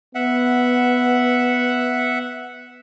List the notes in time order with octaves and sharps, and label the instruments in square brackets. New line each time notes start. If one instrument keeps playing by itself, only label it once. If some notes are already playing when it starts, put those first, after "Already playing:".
[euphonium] B3 [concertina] E5 F#5